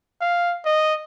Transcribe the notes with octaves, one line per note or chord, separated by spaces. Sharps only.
F5
D#5